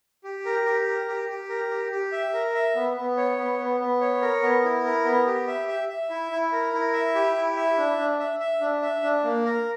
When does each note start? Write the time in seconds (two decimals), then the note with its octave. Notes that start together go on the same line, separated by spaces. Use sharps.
0.24 G4
0.46 A#4
0.66 G4
0.87 A#4
1.08 G4
1.29 G4
1.49 A#4
1.71 G4
1.92 G4
2.12 E5
2.33 A#4
2.55 E5
2.75 B3
2.97 B3
3.17 C#5
3.38 B3
3.59 B3
3.80 B3
4.01 C#5
4.22 A#4
4.43 B3
4.64 E4
4.84 A#4
5.05 B3
5.26 G4
5.47 E5
5.68 E5
5.89 E5
6.10 E4
6.31 E4
6.52 A#4
6.73 E4
6.93 E5
7.15 G4
7.36 E4
7.57 E5
7.77 D4
7.98 D4
8.19 E5
8.40 E5
8.61 D4
8.82 E5
9.03 D4
9.24 A#3
9.45 A#4